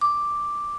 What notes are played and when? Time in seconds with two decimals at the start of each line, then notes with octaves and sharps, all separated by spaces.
0.01 D6